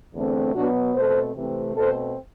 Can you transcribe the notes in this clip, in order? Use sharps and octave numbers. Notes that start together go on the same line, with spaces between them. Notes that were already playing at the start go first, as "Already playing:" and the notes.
E2 D3 A3 C4
B2 F#3 B3 D4 F#4
B2 A3 C4 A4 C5
C3 E3 A3 C4
B2 A3 C4 A4 C5